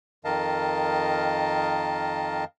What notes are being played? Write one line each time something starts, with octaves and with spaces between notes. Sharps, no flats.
F2 D#3 A#4 D#5 F5 A5